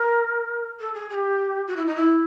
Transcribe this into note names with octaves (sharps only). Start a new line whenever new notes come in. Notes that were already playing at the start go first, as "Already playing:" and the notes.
Already playing: A#4
A4
G#4
G#4
G4
F#4
E4
D#4
E4